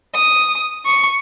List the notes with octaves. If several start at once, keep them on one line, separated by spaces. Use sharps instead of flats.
D#6
C#6